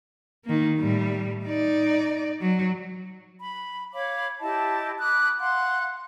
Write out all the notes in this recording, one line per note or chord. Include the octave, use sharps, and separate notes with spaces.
D#3 A#3
A2 G3
D#4 D5
F#3
B5
C#5 F5 B5 D6
E4 G4 D#5 A5
B5 D6 D#6 F#6
F5 F#5 C6 F#6